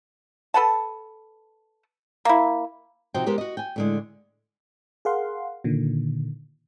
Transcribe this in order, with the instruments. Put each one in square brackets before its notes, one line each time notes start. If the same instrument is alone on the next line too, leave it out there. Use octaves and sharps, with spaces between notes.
[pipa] A4 B4 F#5 A5
A#3 E4
[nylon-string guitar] C3 F3 D#4 F#4 C5 G5
G#3 B3 G4 A#4 C5
F#4 D#5
G5 G#5
A2 D3 G#3
[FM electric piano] G#4 A#4 F5 F#5 C6
A#2 D3 D#3